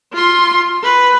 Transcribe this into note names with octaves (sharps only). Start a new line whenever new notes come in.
F4 C6
B4